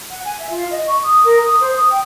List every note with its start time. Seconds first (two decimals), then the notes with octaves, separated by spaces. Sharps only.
0.09 F#5
0.24 G#5
0.38 E5
0.50 F4
0.71 D#5
0.85 C#6
1.04 D#6
1.25 A#4
1.45 D#6
1.61 C5
1.75 D#6
1.90 G5